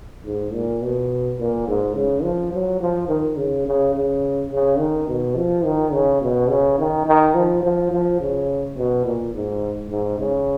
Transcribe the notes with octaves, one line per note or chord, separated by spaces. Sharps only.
G#2
A#2
B2
A#2
G#2
C#3
F3
F#3
F3
D#3
C#3
C#3
C#3
C#3
D#3
B2
F3
D#3
C#3
B2
C#3
D#3
D#3
F3
F3
F3
C#3
B2
A#2
G#2
G#2
C#3